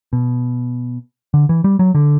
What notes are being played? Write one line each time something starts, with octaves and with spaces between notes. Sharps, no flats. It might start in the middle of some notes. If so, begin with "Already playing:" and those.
B2
D3
E3
G3
F#3
D3